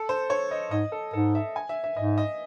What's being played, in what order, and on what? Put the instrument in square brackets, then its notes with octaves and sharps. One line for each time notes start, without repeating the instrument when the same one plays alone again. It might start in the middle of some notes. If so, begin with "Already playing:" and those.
Already playing: [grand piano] A4
C5
C#5
D#5
[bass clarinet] G#2 [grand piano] D#5
[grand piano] A4
[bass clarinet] G#2 [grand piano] A4
[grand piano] E5
G#5
E5
E5
[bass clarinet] G#2 [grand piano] D#5
[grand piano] D#5